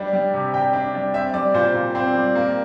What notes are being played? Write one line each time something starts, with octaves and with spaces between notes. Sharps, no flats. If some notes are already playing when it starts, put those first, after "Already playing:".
Already playing: G3 D4
G3
C3
C3 G5
D4
G3
C4 E5
G3 D5
A#2 C5
A#2
C4
G3
A#3